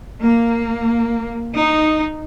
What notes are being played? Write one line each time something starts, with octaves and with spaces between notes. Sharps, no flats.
A#3
D#4